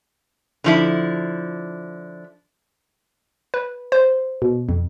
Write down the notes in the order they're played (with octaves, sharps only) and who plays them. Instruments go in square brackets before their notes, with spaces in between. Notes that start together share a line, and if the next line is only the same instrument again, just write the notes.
[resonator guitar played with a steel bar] D3 F3 E4
[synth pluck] B4
C5
B2
F2